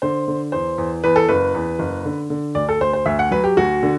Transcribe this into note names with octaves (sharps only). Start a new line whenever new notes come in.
D3 C5
D3
E2 C5
E2
E2 B4
A4
F#1 B4
E2
F#1
D3
D3
D2 D5
A4
D2 C5
C5
D2 E5
F#5
F#3 B4
G4
D2 F#4
D3